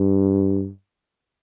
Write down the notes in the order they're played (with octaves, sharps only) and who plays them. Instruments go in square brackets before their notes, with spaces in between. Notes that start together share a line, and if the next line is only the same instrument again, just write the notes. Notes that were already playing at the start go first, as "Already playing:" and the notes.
Already playing: [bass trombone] G2